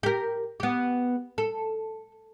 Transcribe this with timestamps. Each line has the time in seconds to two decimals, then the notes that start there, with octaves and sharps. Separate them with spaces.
0.03 G4 A#4
0.60 B3 G4
1.38 A4